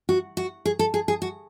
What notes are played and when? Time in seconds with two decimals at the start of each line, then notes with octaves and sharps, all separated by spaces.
0.09 F#4
0.37 F#4
0.65 G#4
0.79 A4
0.94 G#4
1.08 G#4
1.22 F#4